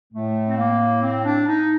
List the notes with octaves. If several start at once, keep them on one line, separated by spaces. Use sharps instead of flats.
A2 A3
C4
A#3
C4
D4
D#4